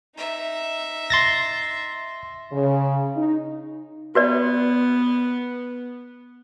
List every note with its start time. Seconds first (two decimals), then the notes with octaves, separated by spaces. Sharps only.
0.15 D#4 E5
1.10 C6 A6 A#6
2.52 C#3
3.16 D#4
4.15 B3 F#4 B4 D5